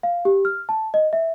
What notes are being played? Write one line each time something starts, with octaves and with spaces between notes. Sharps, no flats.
F5
G4
F6
A5
D#5
E5